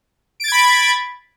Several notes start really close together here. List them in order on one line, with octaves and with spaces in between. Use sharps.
D7 A6 G#6 B5